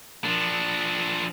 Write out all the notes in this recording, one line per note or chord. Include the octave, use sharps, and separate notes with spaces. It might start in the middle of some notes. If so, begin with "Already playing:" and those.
F3 D4